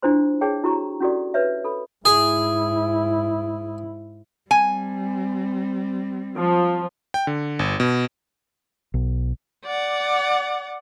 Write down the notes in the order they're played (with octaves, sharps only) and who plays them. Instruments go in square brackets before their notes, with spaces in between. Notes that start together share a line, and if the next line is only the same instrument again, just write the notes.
[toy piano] D4 E4 F4 C5 C6
G#4 C#5 G5 A5
E4 F#4 G4 A#5 C#6
C#4 E4 F#4 G4 A4 D5
B4 C#5 E5
A4 B5
[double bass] G#2 E4 [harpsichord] G#4
[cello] G3 C4 [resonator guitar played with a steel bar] G#5
[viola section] F3
[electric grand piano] G5
D3
G1
B2
[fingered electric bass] B1
[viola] D5 F#5